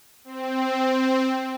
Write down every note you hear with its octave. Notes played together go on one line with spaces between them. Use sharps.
C4